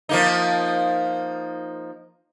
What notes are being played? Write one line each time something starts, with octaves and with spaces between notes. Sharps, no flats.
F3 A#3 D#4